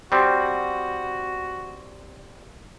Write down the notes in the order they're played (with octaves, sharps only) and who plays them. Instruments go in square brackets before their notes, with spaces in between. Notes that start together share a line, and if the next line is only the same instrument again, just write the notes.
[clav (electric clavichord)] G3 C4 [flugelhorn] F#4